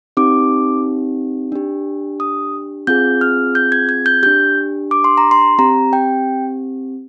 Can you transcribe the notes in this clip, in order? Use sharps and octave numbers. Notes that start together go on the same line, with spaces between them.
C4 D#4 G4 D6
D4 G4
D#6
C4 F4 G#4 G6
F6
G6
G#6
G#6
G6
D4 G4 G6
D6
C6
A#5
C6
C4 G4 A#5
G5